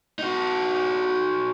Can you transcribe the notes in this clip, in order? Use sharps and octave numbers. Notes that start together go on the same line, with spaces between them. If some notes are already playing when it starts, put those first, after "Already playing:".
D#4 F#4